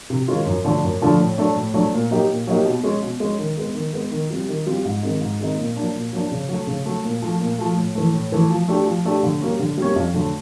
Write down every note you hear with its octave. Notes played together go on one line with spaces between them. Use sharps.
C3
D#3 G#3 C#4 F4
F#2
D3 F3 A3 D4
F#2
D3 F3 A3 D4
A2
F#3 A3 D4
A2
F#3 A3 D4
A#2
F#3 A#3 D#4 G4
A#2
F#3 A#3 D#4 G4
B2
G#3 C#4
B2
G#3 C#4
D#3
G#3 B3
D#3
G#3 B3
D#3
G3 C4 F4
D#3
G3 C4 F4
G#2
D#3 G#3 C4 D#4
G#2
D#3 G#3 C4 D#4
A#2
F#3 A#3 D4
A#2
F#3 A#3 D4
C#3
F#3 A3
C#3
F#3 A3
A#2
F3 A3
A#2
F3 A3
A2
E3 A3
A2
E3 A3
F3
A3 D4 G4
F3
A3 D4 G4
D3
G3 A#3 C#4
D3
G3 A#3 C#4
F2
D3 F#3 A3